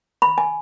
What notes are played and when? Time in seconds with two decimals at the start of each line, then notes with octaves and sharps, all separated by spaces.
0.22 B5
0.38 G#5